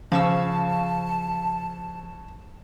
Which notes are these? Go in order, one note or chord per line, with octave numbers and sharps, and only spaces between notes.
C#3 F3 F5 A5 C#6 E6